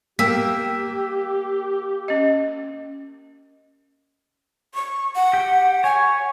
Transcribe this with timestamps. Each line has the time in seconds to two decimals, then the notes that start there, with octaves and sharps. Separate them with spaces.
0.19 A#3 G4 G5 E6 B6
2.08 C#4 D#5
4.74 C#6
5.16 F#5
5.33 G4 G5
5.84 C#5 G#5